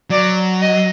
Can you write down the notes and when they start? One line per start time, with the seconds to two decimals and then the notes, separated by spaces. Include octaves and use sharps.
0.10 F#3 D5
0.62 D#5